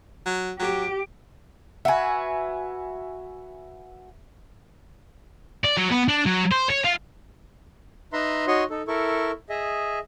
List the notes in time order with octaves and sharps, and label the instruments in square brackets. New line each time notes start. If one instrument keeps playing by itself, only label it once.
[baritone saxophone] F#3
[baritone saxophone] F#3 [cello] G4
[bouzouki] F#4 B4 [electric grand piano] E5 G#5
[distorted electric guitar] D5
F#3
B3
D4
F#3
C5
C#5
F4
[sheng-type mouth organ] D#4 B4 E5 A#5 C6
D#4 F#4 C#5 D#5 C6 C#6
D#4 A4
E4 A4 A#4 C#6
G#4 D#5 E5